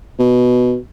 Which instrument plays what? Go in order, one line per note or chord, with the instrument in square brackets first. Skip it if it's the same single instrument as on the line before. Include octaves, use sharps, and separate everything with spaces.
[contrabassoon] B2